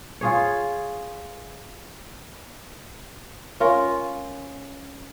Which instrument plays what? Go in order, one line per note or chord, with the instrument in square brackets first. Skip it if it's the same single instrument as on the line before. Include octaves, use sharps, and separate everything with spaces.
[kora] F4 G#4 C#5
C#4 F4 A#4